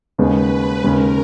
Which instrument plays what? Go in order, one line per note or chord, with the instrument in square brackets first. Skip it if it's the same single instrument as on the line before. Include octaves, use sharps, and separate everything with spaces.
[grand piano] D#2 C#3 G#3 B3 [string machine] B4
[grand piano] D#2 C#3 G#3 [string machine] A#4